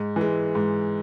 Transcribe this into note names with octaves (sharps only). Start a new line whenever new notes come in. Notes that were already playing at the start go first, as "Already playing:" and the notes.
Already playing: G#2
E3 G#3
G#2